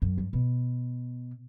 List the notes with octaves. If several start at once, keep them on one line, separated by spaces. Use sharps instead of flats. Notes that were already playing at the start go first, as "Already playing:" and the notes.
F#2
G2
B2